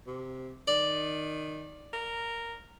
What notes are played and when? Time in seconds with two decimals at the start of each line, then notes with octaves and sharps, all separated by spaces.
0.07 C3
0.67 D#3 D5
1.93 A#4